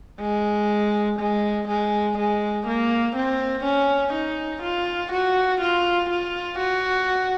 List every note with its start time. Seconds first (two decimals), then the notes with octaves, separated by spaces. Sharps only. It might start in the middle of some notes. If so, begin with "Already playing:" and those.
0.20 G#3
1.20 G#3
1.68 G#3
2.18 G#3
2.67 A#3
3.16 C4
3.64 C#4
4.13 D#4
4.63 F4
5.12 F#4
5.61 F4
6.10 F4
6.59 F#4